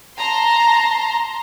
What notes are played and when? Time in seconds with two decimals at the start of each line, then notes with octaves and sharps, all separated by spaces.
0.17 A5 A#5 C6